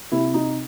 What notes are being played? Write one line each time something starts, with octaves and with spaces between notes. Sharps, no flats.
C3 E4
D#4